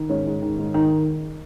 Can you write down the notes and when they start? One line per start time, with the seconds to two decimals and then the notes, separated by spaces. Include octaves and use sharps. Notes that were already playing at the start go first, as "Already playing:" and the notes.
Already playing: D#3
0.09 G#2 C#4
0.26 G#2
0.42 D#3
0.58 G#2
0.74 D#3 D#4